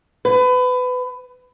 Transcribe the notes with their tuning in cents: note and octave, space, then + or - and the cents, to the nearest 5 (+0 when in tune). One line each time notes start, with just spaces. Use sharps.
B4 +25